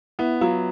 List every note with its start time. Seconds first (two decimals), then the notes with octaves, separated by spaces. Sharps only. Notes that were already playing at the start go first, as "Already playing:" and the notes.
0.19 B3 E4
0.41 F#3 F4